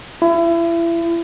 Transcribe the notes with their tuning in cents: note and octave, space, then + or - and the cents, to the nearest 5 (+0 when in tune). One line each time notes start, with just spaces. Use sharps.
E4 +30